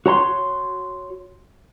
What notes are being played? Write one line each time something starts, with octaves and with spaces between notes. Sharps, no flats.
F#4 C#5 A#5 C6